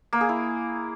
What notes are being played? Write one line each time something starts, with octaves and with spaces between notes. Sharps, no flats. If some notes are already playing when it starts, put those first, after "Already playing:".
A#3
G#4
E4